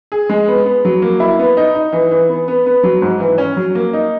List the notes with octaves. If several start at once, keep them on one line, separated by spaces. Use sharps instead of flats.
G#4
G#3
B3
B3
F#3
A#3
E4
B3
D#4
D#4
E3
E3
B3
B3
B3
F#3
G#2
E3
C#4
F#3
A#3
D#4